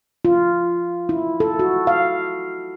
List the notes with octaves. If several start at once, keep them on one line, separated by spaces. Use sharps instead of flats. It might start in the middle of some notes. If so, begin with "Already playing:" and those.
F4
E4
A4
F#4
F5